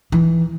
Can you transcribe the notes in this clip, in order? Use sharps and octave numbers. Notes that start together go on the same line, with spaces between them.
E3